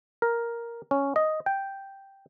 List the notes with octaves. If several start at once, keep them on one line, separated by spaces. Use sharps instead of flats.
A#4
C#4
D#5
G5